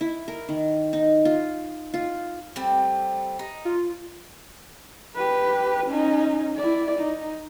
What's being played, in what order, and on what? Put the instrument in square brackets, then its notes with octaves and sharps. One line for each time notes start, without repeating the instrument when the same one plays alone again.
[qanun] E4
A#4
D#3
D#4
F4
F4
[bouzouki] G3 A3 C4
D#4
[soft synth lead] F4
[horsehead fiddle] G4 B4
C#4 D#4
E4 D5
D#4